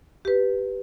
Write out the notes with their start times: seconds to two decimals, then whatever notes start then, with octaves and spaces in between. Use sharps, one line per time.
0.25 G4 B4